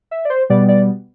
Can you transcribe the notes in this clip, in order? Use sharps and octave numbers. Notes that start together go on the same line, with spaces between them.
E5
D5
C5
B2 G3 B3 D5
D5